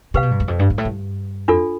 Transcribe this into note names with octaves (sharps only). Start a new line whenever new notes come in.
C3 G4 B4 F5
B2
G2
E2
F2
G2
G2
A2
G2
F2 D4 F4 A4